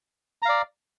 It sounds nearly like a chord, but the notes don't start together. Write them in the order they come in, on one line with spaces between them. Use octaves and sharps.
A#5 F5 D5